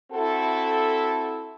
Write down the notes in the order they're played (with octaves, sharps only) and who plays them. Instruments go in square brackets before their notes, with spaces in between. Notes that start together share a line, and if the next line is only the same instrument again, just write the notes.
[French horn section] C4 E4 F#4 A4